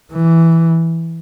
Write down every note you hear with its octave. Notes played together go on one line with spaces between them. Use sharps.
E3